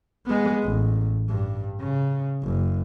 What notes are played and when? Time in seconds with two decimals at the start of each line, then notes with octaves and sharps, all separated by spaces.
0.26 G#3 B3
0.62 A1
1.29 G2
1.80 C#3
2.43 F#1